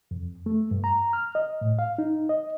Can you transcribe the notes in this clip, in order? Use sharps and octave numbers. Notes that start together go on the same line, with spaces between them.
F2
A3
G2
A#5
F6
D#5
A2
F5
D#4
D#5